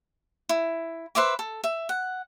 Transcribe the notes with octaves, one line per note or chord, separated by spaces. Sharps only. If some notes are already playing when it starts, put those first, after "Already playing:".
E4
B4 C5 E5 D6
A4
E5
F#5